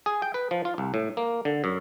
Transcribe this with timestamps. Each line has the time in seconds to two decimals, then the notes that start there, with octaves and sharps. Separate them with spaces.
0.06 G#4
0.22 G5
0.34 B4
0.51 F3
0.65 F4
0.78 C2
0.94 A2
1.17 A#3
1.45 D3
1.64 F#2